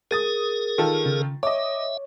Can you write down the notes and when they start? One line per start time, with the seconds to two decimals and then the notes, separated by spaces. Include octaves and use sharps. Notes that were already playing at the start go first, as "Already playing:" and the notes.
0.11 G#4 A#4 D#6 A6 D#7
0.78 D#3 F4 A4
1.06 C#3
1.43 C#5 D#5 E5 D6